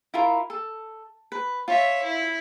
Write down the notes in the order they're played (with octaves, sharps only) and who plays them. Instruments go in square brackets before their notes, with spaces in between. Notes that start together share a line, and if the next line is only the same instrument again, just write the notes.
[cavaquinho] E4 F4 A#4
A4
B4
[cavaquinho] F4 [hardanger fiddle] C#5 E5
[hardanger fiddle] E4